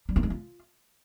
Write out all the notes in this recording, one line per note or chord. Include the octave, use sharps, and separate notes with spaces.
G3
A#3
G#3
F4